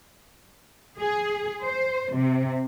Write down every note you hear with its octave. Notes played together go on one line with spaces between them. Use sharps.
G#4
C5
C3